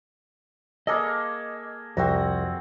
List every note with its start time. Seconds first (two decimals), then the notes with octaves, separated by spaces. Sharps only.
0.87 A#3 G#4 A4 D#5
1.97 C2 F2 C4 F#4 A#5